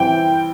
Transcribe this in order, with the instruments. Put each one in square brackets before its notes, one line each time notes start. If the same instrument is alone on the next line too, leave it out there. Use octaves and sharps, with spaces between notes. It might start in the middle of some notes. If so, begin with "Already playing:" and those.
Already playing: [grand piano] E3 G3 C4 [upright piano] G5